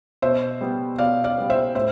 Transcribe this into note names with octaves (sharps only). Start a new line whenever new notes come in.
B2 C5 E5
G3 B3
B2 D5 F5
D5 F5
G3 B3
C5 E5
A2 C5 E5